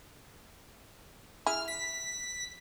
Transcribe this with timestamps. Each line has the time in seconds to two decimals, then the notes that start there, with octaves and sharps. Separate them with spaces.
1.46 E4 G#4 F6
1.68 B6